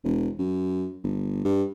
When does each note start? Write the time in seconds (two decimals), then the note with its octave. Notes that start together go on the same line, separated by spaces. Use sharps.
0.04 E1
0.39 F#2
1.04 G1
1.45 G2